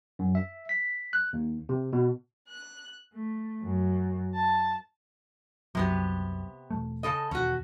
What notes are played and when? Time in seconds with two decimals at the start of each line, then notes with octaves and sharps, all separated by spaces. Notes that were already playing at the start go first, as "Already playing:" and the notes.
0.19 F#2
0.35 E5
0.69 B6
1.13 F#6
1.33 D#2
1.69 C3
1.93 B2
2.49 F#6
3.12 A3
3.62 F#2
4.34 A5
5.75 C2 F#2 C3 F#3 B3 G4
6.71 E1 A3
7.03 C#3 A4 D#5
7.31 E1 D#2 C#4 F#4